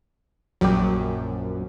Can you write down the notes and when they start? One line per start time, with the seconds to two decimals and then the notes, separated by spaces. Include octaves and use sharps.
0.61 A#1 F#2 F#3 G3 G4